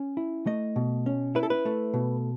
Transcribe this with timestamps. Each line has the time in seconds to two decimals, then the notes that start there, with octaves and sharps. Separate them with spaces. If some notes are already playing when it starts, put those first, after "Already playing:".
Already playing: C#4
0.17 E4
0.46 A3 D#5
0.76 B2
1.06 C#4
1.35 E4 B4
1.43 A4
1.50 B4
1.65 A3
1.94 B2